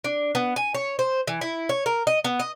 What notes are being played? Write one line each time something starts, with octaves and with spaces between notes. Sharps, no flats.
D4
B3
G#5
C#5
C5
E3
E4
C#5
A#4
D#5
B3
D#5